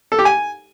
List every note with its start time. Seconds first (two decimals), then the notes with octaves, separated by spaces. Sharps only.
0.12 A4
0.19 G4
0.25 G#5